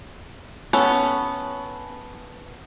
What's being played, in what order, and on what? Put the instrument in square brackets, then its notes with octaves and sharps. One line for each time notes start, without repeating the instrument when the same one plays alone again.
[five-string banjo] B3 C#4 A4